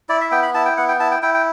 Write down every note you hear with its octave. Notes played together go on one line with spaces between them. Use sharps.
E4 D5
E5
B3 G5
B5
E4 A5
G5
B3 F#5
G5
E4 A5
G5
E4 G5
G5